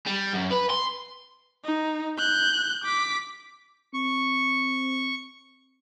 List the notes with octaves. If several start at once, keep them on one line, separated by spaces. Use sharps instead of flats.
G3
F#2
B4
C6
D#4
F#6 G6
D6 B6
C4 C#6